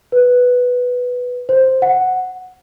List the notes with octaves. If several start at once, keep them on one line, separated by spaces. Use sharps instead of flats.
B4
C5
F#5